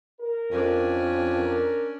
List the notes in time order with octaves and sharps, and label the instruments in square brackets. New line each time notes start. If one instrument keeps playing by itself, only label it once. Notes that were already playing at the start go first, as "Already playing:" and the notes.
[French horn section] A#4
[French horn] F2 [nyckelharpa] C#4 D4
[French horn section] A#4